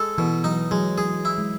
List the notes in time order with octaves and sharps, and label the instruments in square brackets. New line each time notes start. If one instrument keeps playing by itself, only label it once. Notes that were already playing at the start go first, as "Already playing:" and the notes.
Already playing: [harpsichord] G#3 A4
[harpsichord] B2 [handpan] E3
[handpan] F#3 [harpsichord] D#4
[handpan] F#3 [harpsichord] G#3
[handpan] F#3 [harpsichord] G#4
[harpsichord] E4
[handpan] G#3